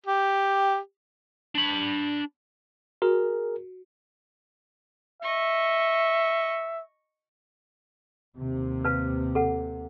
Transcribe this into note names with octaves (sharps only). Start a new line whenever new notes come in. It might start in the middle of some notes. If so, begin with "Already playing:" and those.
G4
D4 B5
F#4 G#4 A#4
D#5 E5 C#6
D#2 C3
B4 F5 A5
A4 F#5